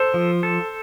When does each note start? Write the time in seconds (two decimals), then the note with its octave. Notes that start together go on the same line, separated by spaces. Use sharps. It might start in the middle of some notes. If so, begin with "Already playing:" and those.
Already playing: A4 C5
0.14 F3
0.43 A4